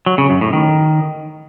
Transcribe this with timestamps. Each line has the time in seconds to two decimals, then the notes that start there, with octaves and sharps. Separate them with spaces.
0.06 F#3
0.18 C#3
0.30 F#2
0.41 A2
0.53 D#3